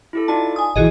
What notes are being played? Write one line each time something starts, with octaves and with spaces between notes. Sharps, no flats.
E4 G4 A4
D#4 F4 D5 A5
G#5 D#6
A#1 D#3 E3 F#4 G#4 D#5